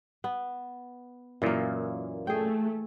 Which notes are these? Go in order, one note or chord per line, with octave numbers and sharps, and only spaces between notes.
B3
F#2 A#2 E3 A#3
A3 G#4 G5